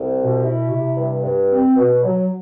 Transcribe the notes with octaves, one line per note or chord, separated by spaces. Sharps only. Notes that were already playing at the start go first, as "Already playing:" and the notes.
Already playing: C2
B2
E4
C3
G2
G2
C4
B2
F#3